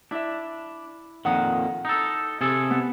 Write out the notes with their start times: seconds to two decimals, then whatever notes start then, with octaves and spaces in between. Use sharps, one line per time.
0.11 D4 E4 E5
1.25 F2 A#2 D#3 F#5 D#6
1.85 D#4 A4
2.41 C3 G#4 A4
2.70 B3